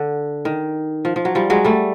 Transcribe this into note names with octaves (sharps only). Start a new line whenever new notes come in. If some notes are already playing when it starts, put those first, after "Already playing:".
Already playing: D3
D#3
F3
F3
F#3
F3 G3
F#3 G#3
G3 A3